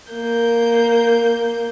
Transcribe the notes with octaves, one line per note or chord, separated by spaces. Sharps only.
A#3 G6